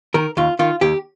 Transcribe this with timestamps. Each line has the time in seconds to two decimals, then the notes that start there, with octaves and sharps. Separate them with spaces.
0.14 D#3 A#4
0.37 D#2 F4
0.59 D#3 F4
0.81 D#2 G4